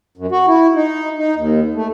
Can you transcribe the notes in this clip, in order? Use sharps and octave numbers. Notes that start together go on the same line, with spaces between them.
F#2
F#4
E4
D#4
D#4
D#2
A3